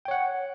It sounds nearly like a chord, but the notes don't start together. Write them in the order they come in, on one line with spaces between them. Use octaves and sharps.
G5 C#5 F#5